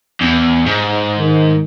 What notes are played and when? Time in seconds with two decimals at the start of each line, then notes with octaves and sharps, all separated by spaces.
0.21 E2
0.66 G#2
1.18 D#3